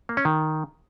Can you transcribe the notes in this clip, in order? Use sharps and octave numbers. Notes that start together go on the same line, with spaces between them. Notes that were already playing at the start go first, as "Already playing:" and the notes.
A#3
C#4
D#3